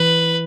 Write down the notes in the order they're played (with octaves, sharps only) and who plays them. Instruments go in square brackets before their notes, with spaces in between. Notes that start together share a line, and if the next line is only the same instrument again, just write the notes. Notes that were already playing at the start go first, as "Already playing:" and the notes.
Already playing: [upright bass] E3 [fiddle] B4